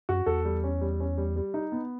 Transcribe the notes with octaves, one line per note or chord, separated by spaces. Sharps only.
F#2 F#4
E2 A4
G3
C#4
G3
C#4
G3
G3
D#4
B3